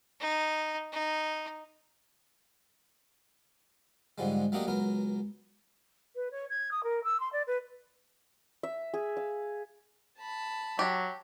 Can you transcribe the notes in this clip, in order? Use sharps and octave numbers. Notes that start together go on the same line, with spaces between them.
D#4
D#4
G#2 D3 F3 G3 G#3
F#3 A3 A#3 D4 G4 D#5
C#2 F#3 B3 A#4
B4
C#5
G#6
D#6
A#4
E6
C6
D5
B4
E5
G#4
F5
A5 B5
F#3 G4